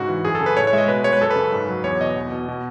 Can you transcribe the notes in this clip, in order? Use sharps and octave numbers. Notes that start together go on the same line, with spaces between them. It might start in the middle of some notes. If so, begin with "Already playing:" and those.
Already playing: G#2 C#3 F#4
E3
F#2 G#4
A4
C#3
B4
A2 C#5
C#5
G#3 D#5 E5
B2 B4
G#3 C#5
B4
F#2 A4
B4
C#3
G#2
F#3
E2 C#5
B2 D#5
E2
B2
B2